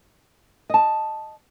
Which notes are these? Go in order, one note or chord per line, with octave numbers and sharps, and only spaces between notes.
D#5 A5